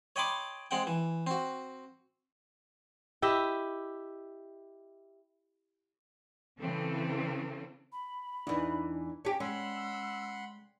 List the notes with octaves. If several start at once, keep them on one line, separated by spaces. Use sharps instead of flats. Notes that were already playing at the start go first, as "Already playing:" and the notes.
C#5 D#5 G5 B5 C6 D6
G#3 C4 F#5 G5
E3
C4 F#4
E4 G4 D#5 E5
C#3 E3 C4 A4
B5
E2 E3 D4 D#4
C#4 G4 A5
G#3 C#4 F#5 B5 C6 E6